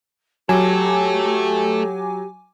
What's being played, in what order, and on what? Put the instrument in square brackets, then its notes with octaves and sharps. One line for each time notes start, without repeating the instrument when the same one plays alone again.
[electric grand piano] F#3 [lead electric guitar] A3 A4 [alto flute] G4 [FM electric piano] G#5 D6